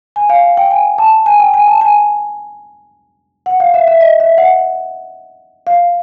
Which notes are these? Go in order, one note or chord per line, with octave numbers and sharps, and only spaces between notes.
G#5
F5
F5
G5
G#5
A5
G#5
G5
G#5
A5
G#5
F#5
F5
E5
E5
D#5
E5
F#5
F5